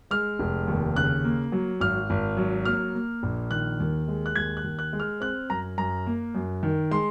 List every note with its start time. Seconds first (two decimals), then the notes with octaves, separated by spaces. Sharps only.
0.11 G#3 F6
0.39 F1
0.68 D#2
0.96 C#3 F#6
1.24 A#3
1.52 F#3
1.80 G#1 F6
2.10 G#1
2.37 F#3
2.65 A#3 F6
2.95 A#3
3.23 A#1
3.51 D#3 F#6
3.80 D#2
4.08 G#3
4.26 F#6
4.36 D#2 G#6
4.57 F#6
4.64 D#2
4.79 F#6
4.93 G#3
5.00 F6
5.21 C4 F#6
5.50 F#2 A#5
5.78 F#2 A#5
6.06 A#3
6.35 F#2
6.63 D#3
6.91 G#3 C6